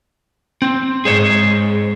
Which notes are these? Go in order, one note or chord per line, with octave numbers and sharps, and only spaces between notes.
C4
G#2 G#4 C5 C#5